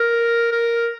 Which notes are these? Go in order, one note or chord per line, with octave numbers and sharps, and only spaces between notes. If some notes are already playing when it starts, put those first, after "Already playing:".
Already playing: A#4
A#4